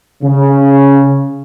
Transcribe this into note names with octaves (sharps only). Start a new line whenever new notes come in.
C#3